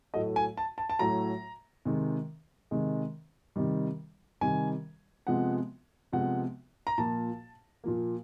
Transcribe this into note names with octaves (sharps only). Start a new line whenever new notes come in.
A2 F#3 A3 D#5
G#5
A5
A5
A5
A2 F#3 A3 A#5
C3 D#3 G#3
C3 D#3 G#3
C3 D#3 G3
C3 D#3 G3 G#5
C3 F3 G#3 B3 F#5
C3 F3 G#3 B3 F#5
A#5
A#2 F3 A#3 A5
A#2 F3 A#3